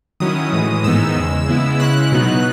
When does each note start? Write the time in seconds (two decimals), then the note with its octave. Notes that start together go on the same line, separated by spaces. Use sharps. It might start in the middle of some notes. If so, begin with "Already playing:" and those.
0.20 D#3 F#3 C#4 E4 D#6
0.53 A2 E3 G#3
0.84 G#2 D#3 G#3 B3 D#4 E6
1.16 E2 C#3 G#3
1.48 C#3 G#3 B3 E4
1.80 C#3 G#3 C#4 E4 F#6
2.12 B2 F#3 B3 D#4